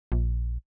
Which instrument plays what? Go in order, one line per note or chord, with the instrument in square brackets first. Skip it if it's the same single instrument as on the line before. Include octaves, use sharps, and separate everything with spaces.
[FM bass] A#1